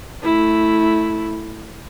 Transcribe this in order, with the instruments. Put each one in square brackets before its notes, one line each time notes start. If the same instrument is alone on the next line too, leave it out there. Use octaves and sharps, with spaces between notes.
[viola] A3 E4